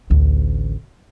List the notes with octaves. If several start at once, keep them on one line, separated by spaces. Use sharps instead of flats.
A1 D2